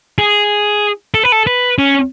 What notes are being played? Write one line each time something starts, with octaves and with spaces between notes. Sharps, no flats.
G#4
A4
B4
A4
B4
C#4